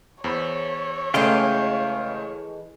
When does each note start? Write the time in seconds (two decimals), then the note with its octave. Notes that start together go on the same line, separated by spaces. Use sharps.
0.24 E2 C5 C#5 B5
1.14 C#3 E3 G#3 A3 A4 F5 G5 C6